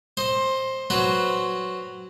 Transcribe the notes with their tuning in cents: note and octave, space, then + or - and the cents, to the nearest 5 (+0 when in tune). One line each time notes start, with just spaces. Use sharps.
C5 +15 D#5 +0
F#3 +0 C4 +0 B4 +0